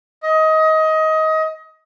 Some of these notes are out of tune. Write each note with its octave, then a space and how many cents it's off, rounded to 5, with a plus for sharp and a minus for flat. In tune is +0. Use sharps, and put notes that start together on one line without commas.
D#5 +20